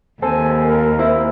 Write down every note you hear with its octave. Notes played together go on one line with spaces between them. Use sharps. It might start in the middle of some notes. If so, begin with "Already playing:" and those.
D#2 C4 A4 G#5
A#4
C4 E4